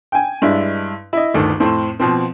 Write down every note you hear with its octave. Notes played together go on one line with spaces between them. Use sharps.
G5 G#5
G2 G#3 D4 E4
E4 D#5
G1 D2 D#3 A3 A4
F2 A2 C4
B2 F3 C4